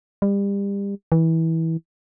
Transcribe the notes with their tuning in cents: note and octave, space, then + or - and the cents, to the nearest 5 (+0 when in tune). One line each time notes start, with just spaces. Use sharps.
G3 +30
E3 -20